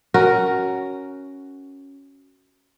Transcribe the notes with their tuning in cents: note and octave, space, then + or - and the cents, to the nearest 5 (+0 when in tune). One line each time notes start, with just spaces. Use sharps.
C#4 +0 F#4 +10 A#4 +0